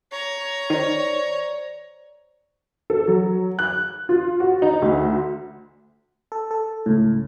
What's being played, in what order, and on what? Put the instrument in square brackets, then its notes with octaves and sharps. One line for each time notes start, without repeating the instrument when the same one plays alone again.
[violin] C#5 A#5
[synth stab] D#3 [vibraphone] C5 D5
[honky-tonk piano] A4
F#3
F#6
F4
F#4
D#4
D2
[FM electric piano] A4
A4
C#2 A2